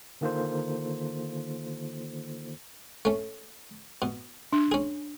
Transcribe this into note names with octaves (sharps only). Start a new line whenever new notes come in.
D3 D#3 A#3 F4 A4 C5
A3 C#4
B2
D4
C#4 G#4